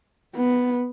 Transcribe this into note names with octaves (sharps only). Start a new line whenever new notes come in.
B3